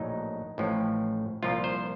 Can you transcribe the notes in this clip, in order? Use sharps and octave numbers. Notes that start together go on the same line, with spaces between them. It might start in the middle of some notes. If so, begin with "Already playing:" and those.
Already playing: A#1 A2 F#3 D#4
A1 A2 F3
C2 A#2 F3 F4
C5